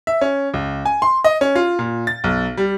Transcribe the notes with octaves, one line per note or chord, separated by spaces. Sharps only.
E5
C#4
C#2
G#5
C6
D#5
C#4
F4
A#2
A6
B1
G3